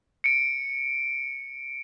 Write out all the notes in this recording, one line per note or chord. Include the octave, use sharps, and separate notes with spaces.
C#7 D7